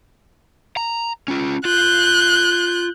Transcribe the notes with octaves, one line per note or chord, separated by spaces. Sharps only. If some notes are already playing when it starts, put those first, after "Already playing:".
A#5
C#4 F4
F4 F#6 G6